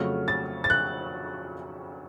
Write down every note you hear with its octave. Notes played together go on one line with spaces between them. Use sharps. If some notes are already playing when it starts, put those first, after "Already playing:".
Already playing: F2 C#3 F#3 A3 F6
A6
A6
F#6